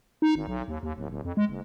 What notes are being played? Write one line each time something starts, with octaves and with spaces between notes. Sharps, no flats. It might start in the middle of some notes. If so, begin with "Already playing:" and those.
D#4
G#1
B1
D#2
D#2
D1
D1
F2
G#3
F#1